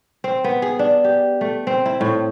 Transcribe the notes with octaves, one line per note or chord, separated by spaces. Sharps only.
C4
B3
G#4
D4
G4
A3
C4
E4
A2